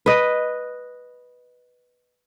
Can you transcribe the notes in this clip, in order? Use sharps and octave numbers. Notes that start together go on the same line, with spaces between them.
B4 D#5